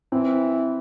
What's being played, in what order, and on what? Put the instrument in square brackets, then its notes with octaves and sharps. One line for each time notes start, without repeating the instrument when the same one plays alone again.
[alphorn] E3 [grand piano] C4